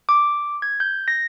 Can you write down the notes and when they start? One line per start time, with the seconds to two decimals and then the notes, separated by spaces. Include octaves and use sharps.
0.09 D6
0.62 G#6
0.80 G6
1.08 A#6